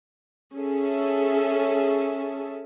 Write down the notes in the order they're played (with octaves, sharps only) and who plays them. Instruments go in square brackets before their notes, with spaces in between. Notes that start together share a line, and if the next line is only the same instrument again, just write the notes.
[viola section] C#4 G#4 A4 E5